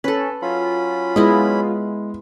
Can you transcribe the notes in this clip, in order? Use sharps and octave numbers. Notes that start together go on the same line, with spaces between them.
C#4 A4 B4
F#3 C#4 F4 B5
G#3 B3 E4 D#5